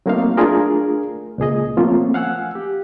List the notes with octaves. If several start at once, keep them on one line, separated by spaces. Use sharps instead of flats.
F#3 A3 A#3 C4 D#4 F5
A3 D4 F4 G#4 A#4
C#2 A#2 G#4 D#5
F3 A3 A#3 C4 C#4 F4
F5 F#5 G#5 E6 F#6
G4